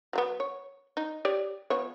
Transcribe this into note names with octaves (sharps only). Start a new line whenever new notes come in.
F#3 A#3 B3
C#5
D#4
G4 C#5 D5
F3 B3 C#5